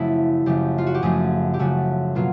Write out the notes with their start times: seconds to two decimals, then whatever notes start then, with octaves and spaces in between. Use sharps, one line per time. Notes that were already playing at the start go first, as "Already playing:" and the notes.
Already playing: F#2 C#3 F3 A3 E4
0.46 F#2 C#3 F3 A3 G4
0.78 F4
0.86 F#4
0.94 G4
1.02 F#2 C#3 F3 A3 G#4
1.54 G4
1.59 F#2 C#3 F3 A3 F#4
2.15 B2 F#3 A#3 F4